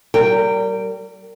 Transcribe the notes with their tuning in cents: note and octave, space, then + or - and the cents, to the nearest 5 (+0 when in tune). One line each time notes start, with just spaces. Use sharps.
G3 -35 A#4 -25 G5 +0